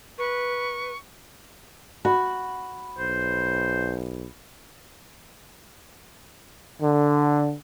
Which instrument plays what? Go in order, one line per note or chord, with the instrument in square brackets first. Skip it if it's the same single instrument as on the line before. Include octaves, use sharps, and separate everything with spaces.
[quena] B4 [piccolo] C#6
[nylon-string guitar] F#4 [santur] B5
[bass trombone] B1 [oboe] C5
[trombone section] D3